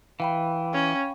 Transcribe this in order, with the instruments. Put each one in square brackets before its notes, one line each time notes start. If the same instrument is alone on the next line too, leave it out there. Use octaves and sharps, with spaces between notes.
[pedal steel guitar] E3 [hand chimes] F5 G5 B5
[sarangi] C#4